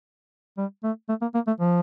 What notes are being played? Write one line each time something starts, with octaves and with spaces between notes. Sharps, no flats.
G3
A3
A3
A#3
A#3
A3
F3